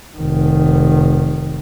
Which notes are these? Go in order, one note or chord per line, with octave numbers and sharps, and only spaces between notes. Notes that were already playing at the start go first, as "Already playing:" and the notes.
F1 D#3